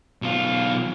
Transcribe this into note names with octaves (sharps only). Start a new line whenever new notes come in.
B1 F4